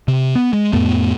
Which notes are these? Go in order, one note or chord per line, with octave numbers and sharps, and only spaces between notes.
C3
B3
G#3
F2 A2 A3 B3